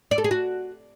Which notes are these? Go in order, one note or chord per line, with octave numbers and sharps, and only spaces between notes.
D5
A4
G#4
F#4